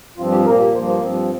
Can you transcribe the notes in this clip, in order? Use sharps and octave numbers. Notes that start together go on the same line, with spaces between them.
G2 F3 C4 F4
G4
A#2 A#3 A#4
G4
G2 F3 A#3 C5
C5
G2 F3 C4